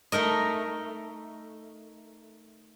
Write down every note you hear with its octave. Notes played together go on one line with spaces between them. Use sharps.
A3 D#4 A#4 D#5